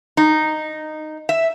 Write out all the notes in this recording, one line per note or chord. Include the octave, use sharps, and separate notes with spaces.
D#4
E5